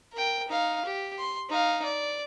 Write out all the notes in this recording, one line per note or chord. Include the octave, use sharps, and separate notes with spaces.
A#4 G5
D#4 F5
G4
C6
D#4 F5
D5